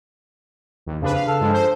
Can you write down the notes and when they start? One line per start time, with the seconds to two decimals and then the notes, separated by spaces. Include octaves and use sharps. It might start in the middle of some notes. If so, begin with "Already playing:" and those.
0.86 D#2
1.01 F2 C#3 D4 B4
1.14 F5
1.28 A4
1.41 G2 F3 G#3
1.53 C5